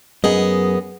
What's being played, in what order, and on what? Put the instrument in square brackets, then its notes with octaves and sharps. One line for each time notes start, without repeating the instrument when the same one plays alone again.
[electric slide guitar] F#2 [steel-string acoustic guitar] B3 G#4 D#5